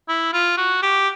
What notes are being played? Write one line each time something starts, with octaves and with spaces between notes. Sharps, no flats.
E4
F4
F#4
G4